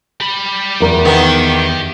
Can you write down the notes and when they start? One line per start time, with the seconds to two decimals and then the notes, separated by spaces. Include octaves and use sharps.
0.21 G4 B5
0.80 E2 A#4
1.05 D#3 B3